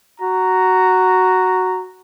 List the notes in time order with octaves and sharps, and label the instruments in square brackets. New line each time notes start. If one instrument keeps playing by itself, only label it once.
[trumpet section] F#4 A#5